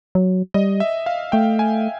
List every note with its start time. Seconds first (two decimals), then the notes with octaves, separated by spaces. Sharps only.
0.15 F#3
0.54 G3 D#5
0.80 E5
1.06 F5
1.32 A3 G5
1.59 G#5